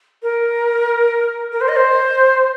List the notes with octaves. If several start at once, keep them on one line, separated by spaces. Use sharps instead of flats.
A#4
A#4
C5
D#5
C5